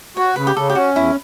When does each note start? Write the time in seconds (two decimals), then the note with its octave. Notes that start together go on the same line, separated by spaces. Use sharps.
0.17 F#4 C#5
0.36 C#3 B4
0.47 G4
0.56 C#3 A4
0.69 G4
0.75 C#4 F#4
0.95 E2 E4